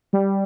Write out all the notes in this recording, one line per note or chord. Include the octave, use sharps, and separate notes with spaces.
G3